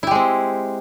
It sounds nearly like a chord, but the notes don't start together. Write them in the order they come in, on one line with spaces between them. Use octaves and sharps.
E4 G4 G#3 C4